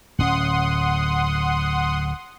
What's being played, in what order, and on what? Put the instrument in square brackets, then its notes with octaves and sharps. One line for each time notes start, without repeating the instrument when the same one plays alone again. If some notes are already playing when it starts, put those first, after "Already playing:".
[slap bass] D1 C#4 [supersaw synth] F#5 C6 D#6